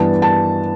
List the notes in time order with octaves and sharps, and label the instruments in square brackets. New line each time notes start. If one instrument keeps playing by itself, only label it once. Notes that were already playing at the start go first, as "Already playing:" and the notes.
Already playing: [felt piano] G2 E3 B3 D4 A5
A5